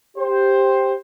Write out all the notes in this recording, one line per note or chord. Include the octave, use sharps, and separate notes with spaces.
G4 C5